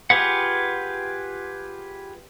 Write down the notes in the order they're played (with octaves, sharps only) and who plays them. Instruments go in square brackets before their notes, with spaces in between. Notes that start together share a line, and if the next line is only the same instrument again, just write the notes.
[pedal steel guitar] F4 G4 G#4 B4 F#5